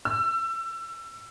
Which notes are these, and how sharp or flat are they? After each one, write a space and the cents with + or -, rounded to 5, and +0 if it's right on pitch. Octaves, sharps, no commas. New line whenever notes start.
E6 +30